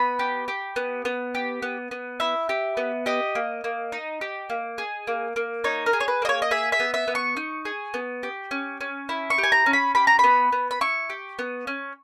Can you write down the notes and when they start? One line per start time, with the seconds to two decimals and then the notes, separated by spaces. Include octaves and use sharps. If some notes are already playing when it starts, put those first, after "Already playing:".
Already playing: B3 B5
0.19 G4
0.48 G4
0.76 B3
1.05 B3
1.35 G4
1.62 B3
1.91 B3
2.20 E4 E5
2.49 G4
2.77 B3
3.06 G4 D#5
3.35 A#3
3.64 A#3
3.92 D#4
4.21 G4
4.50 A#3
4.78 G#4
5.07 A#3
5.36 A#3
5.64 D#4 C#5
5.86 A#4
5.93 G#4
6.00 C#5
6.08 B4
6.22 A#3 D#5
6.29 C#5
6.42 D#5
6.51 G#4 E5
6.72 E5
6.80 B3
6.94 E5
7.08 B3
7.15 C#6
7.37 D#4
7.65 G#4
7.94 B3
8.23 G4
8.51 C#4
8.81 C#4
9.09 E4
9.30 C#6
9.38 G4
9.43 G#5
9.52 A#5
9.66 C#4
9.73 B5
9.95 G4 B5
10.07 A#5
10.19 B3 B5
10.52 B3
10.71 B5
10.81 E4 C#6
11.10 G4
11.39 B3
11.67 C#4